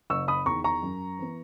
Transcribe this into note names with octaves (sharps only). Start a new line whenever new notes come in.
F#1 C#6 E6
B5 D#6
E2 D#3 A#5 C#6
A#5 C#6
F#2
E3 B3